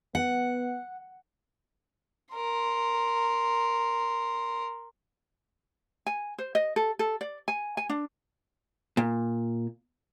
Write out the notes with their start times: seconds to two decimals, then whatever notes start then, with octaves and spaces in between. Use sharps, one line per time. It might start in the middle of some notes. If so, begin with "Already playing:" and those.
0.15 B3 F#5
2.35 A#4 C6
6.06 G#5
6.38 C5
6.55 D#5
6.76 A4
6.99 A4
7.21 D5
7.48 G#5
7.77 G#5
7.89 D4
8.97 A#2